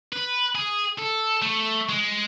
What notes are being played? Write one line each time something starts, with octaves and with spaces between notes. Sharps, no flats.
B4
G#4
A4
A3
G#3